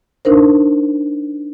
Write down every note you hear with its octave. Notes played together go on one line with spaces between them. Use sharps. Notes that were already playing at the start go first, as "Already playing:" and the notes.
D4 D#4 A#4 C5